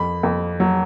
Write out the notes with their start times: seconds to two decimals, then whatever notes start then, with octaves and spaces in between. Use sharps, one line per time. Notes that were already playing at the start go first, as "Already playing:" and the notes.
Already playing: F2 B5
0.23 F2
0.60 F#3